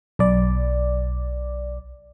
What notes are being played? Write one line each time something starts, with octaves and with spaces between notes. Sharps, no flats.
B1 D5